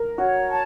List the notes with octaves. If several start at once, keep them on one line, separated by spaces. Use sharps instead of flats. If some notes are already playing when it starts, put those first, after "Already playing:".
Already playing: A#4
F#4 C#5
A5